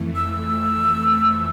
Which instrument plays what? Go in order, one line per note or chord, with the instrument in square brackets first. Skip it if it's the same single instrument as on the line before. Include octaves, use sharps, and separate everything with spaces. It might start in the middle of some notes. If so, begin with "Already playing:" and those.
Already playing: [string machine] F2 E3 A3
[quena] E6